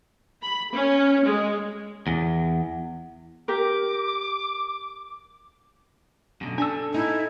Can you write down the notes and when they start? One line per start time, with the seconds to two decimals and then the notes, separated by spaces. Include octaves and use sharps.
0.43 B5
0.71 C#4
1.24 G#3
2.07 E2
3.48 G4 A#4 D6
6.41 F#2 B2 D3
6.58 D4 A4 G#5 E6
6.94 D#4 E4